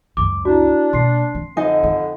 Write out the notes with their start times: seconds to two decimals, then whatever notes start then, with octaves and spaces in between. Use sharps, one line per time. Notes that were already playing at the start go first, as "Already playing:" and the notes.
0.17 C#2 F#2 D6
0.45 D4 E4 F#4
0.93 B2 A#3 C6 C7
1.35 C4
1.57 F2 D3 D#4 D#5 G#5
1.83 F4